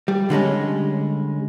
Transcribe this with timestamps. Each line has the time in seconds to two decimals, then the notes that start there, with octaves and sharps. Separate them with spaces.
0.08 G3
0.30 D3 G3 G#3 C#4